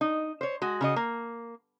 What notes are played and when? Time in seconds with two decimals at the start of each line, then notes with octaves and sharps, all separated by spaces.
0.01 D#4
0.41 C5 C#5
0.62 G#3 F#4
0.81 C#3 F#4 D#5
0.96 A#3